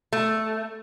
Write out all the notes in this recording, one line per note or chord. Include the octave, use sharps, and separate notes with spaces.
A3